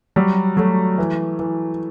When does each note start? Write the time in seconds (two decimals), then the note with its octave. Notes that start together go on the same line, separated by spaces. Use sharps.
0.16 F#3 G3
0.57 F#3 A3
0.98 E3
1.39 E3